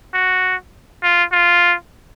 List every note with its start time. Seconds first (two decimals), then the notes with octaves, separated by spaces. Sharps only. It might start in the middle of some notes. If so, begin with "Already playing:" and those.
0.14 F#4
1.03 F4
1.32 F4